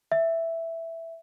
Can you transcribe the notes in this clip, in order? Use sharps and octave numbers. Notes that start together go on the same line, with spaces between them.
E5